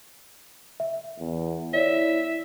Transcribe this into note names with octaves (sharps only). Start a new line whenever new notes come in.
E5
E2
E4 C#5 D5 E5